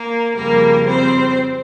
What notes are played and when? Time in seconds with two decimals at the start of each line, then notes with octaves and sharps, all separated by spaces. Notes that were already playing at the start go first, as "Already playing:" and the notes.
Already playing: A#3 A#4
0.34 F2 C#3 G3 A#3 A#4
0.86 C4 C5